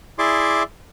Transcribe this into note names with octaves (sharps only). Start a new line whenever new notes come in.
E4 G#4 D5 E5 C6 D6